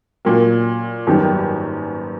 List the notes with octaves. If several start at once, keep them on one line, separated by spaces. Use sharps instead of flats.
A#2 F#3 A#3
G#1 F#2 D#3 G3 B3